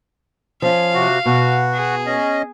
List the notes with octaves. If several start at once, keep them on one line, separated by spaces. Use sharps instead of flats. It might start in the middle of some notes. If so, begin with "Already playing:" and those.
F3 C#4 F5
C3 F#4
B2 F#4
G#4
C#4 D#5